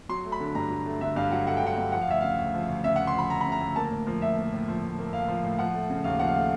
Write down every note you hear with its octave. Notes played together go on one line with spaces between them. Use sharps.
F#3 C6
A3
B5
D3
G2 A#5
F#3
A3
D3 E5
G2 F5
F#3 F#5
A3 F#5
G5
D3 F#5
G2
F3 F#5
F5
D2 E5
C#3 F5
D2
F3
D2
C#3 E5
F#5
D2
C6
F3 B5
D2 A#5
C#3 B5
A#5
D2
A#3 A5
A2
F3
A2 E5
A#3
A2
F3
A2
A#3
A2 F5
F3
A2
F3 F#5
A3
C#3
D#2 F5
F3 F#5
F5
A3